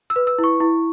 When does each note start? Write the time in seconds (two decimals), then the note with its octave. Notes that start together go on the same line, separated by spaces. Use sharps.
0.10 E6
0.16 B4
0.27 E6
0.38 E4
0.44 C#6
0.60 E4